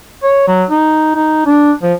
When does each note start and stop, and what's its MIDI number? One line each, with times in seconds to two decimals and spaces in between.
0.23 0.47 73
0.48 0.64 54
0.70 1.11 63
1.15 1.43 63
1.46 1.72 62
1.82 1.93 53